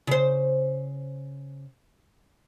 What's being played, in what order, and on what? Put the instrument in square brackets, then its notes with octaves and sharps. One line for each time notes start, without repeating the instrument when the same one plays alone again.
[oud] C#3 C5